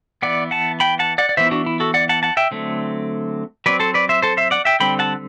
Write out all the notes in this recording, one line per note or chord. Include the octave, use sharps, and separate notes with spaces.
E3 B3 D5 F#5
F#5 A5
G5 B5
F#5 A5
D5 F#5
D5
E3 B3 C5 E5
E4
D4 F#4
E4
F#4 A4
D5 F#5
F#5 A5
F#5 A5
E5 G5
D3 F#3 A3 C4
F#3 C4 B4 D5
A4 C5
B4 D5
C5 E5
A4 C5
C5 E5
D5 F#5
E5 G5
D3 G3 C4 G5 B5
F#5 A5